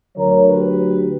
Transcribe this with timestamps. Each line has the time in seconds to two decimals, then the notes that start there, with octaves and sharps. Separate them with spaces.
0.16 D2 D3 F#3 A#4 C#5
0.46 G4 B4